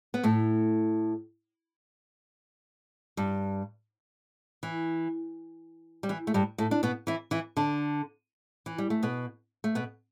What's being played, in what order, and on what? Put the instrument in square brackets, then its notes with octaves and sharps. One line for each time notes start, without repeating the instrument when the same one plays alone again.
[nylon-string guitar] B3
A2 A3
G2 G3
E3
G3
E3
A3
G2 G3
A2 A3
D4
B2 B3
E3 E4
E3 E4
D3 D4
E3
G3
A3
B2 B3
A3
B2 B3